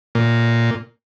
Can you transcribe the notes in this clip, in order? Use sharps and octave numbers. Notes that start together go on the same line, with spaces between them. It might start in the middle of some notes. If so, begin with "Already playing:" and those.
A#2